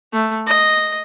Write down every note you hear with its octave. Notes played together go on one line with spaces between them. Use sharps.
A3
D#5